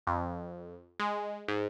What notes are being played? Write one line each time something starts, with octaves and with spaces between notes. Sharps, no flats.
F2
G#3
G#2